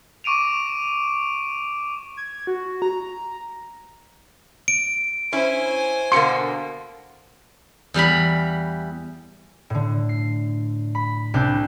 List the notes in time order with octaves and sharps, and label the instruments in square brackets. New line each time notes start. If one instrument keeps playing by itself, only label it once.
[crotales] C#6 D6 D7 D#7 F7
[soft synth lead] G#6
F#4
A#5
[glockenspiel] D7
[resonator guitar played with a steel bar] C#4 E4 [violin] C5 G#5
[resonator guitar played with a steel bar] B2 D3 A#3 [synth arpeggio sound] C6 C#7
[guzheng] E2 G3 A#5 B5
[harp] A2 D3
C7
B5
C2 C3 D4 F#6 G6